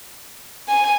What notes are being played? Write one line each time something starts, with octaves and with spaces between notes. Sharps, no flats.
G#5